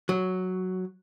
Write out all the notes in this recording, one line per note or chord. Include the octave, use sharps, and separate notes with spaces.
F#3